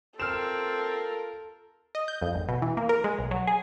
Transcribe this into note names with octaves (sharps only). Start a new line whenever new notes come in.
C4 F4 A4 A#4 F6 E7
D#5
G6
F2
G#1
B2
E3
A#3
A#4
G#3
B1
F#3
G#4